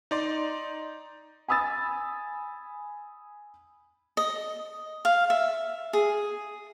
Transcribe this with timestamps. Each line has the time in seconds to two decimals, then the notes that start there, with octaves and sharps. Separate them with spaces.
0.11 D#4 D5 C6
1.48 G#5 B5 D#6 E6 A6
4.17 D#5
5.05 F5
5.30 E5
5.93 G#4